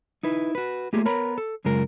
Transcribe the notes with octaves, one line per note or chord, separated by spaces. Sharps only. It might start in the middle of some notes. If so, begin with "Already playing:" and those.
D#4 E4 B4
F#4 B4
A3 A#3 F4 G4 G#4
B3 A#4 C#5 A#5 B5
A4
F#2 C#3 G#3 F4 A#4